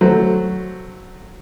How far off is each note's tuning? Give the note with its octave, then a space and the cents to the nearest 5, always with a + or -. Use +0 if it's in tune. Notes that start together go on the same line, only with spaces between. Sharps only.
F#3 +0 A3 +0 C5 +0